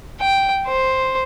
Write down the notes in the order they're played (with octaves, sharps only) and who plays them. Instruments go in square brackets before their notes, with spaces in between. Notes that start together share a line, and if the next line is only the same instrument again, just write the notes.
[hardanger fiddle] G5
C5